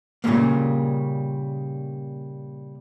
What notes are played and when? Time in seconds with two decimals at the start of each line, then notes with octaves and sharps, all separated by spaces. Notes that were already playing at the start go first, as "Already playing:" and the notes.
0.24 A#2 C#3 F3 G3 A3 A#3